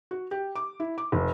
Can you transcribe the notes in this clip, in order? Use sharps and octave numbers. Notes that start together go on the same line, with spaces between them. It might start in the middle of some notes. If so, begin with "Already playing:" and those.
F#4
G4
D6
E4
D6
F1